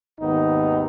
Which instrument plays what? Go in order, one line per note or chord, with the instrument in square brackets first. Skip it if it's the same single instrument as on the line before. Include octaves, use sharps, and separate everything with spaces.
[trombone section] G#1 D#2 B3 D#4